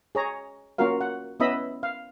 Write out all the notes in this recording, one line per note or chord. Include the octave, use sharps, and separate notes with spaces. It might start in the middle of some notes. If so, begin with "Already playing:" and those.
G#4 C#5 A#5
A#3 C#4 F4 F#4 A#4 F5
F#5
B3 C#4 E4 D#5 E5 B5
F5